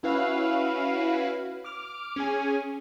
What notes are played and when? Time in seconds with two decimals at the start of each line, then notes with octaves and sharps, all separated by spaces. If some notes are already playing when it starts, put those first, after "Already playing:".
0.03 C#4 E4 F#4 B4 F5
1.64 D6 F6
2.16 C#4 G#4 G#5